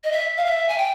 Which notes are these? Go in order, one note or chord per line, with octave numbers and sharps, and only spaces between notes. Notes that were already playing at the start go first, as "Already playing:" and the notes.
D#5
E5
F5
E5
G#5
G5